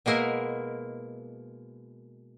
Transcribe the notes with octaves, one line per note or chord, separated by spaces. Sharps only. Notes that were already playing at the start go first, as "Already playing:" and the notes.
B2 G#3 A#3 E4 A#4